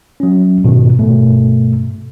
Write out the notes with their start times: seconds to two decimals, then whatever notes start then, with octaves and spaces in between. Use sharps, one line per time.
0.20 F#3 C#4
0.64 G#2 B2 D#3
0.99 G2 B2 A3